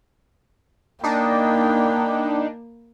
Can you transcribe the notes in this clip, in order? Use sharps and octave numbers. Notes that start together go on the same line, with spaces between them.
A#3 D4 D#4 G5 B5